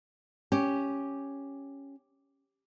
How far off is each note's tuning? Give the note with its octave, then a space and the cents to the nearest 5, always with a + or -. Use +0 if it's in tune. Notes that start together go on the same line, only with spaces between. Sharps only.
C#4 +0 G4 +0